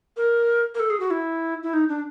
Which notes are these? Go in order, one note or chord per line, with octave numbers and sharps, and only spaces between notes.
A#4
A#4
A4
G#4
F#4
E4
E4
D#4
D4